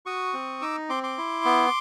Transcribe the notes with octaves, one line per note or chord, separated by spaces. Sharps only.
F#4 C#6 D#6
C4
D#4 D6 E6
C4 C6 D6
C6 D6
E4
B3